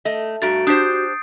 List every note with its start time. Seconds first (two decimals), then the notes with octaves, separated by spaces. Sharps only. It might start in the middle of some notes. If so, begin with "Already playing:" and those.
0.05 A3 D#5
0.42 G2 A3 F#4 A#5 A6 D7
0.67 D4 G4 C5 D#6 G6 C7